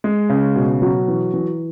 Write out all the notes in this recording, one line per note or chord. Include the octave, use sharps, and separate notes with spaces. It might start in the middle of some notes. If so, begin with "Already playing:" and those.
G#3
C#3
B2
F#3
E3
E3